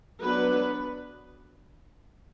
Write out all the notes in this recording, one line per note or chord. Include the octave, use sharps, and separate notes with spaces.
F#3 B3 D4 B4